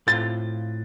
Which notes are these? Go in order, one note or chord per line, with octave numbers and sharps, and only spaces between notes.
A2 A3 C4 F4 A6